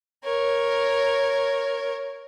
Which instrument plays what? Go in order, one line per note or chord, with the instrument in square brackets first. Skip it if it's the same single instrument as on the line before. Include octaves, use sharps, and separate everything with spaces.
[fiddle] A#4 C#5